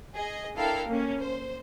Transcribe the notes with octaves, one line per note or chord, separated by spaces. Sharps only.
G#4 D#5
D4 E4 A4 A#4 F5 G5
A#3 C#4
C5